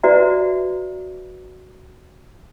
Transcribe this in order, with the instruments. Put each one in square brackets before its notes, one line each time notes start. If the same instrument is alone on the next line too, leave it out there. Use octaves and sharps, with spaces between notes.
[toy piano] F#4 B4 D5 E5 A#5